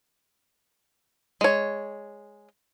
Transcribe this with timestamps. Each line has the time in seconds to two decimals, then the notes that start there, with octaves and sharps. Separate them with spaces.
1.41 G#3 C#5